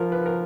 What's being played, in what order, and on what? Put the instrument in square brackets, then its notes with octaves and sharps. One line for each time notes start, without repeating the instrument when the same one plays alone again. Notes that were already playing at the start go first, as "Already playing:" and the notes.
Already playing: [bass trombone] F3 [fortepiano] A#4
[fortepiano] B4
A#4